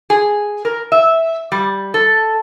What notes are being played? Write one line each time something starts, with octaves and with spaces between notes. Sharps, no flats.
G#4
A#4
E5
G3
A4